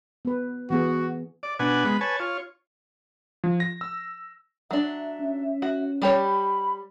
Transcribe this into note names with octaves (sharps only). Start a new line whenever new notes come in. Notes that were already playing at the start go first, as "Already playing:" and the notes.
B3 B4
E3 B3 F#4 G#4
D5
B2 D4 B4 F#5 G#5
G#3 B3 B5
B4 C#5 G#5 A5
F4 C#5
F3
A#6
E6
F#3 D4 E5
C#4
F#4
G3 G4 C#5 B5